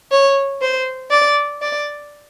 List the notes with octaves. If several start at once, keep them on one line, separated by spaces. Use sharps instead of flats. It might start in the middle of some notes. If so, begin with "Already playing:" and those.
C#5
C5
D5
D5